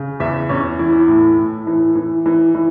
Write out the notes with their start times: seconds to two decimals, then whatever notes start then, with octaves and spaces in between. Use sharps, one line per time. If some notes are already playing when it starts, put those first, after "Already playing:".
Already playing: C#3
0.20 E2 E5
0.49 E2 C#4
0.79 E3 E4
1.08 A2
1.38 A2
1.67 E3
1.95 E3
2.26 E3
2.55 E3